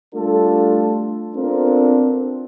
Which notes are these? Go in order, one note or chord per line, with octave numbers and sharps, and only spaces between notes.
G3 A3 D4 F4 A4
B3 C4 D4 F4 A4 A#4